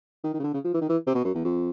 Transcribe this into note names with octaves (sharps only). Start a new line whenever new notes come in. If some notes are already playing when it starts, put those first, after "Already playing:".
D#3
D#3
C#3
D3
C#3
F3
E3
D#3
E3
C3
B2
F#2
E2
F2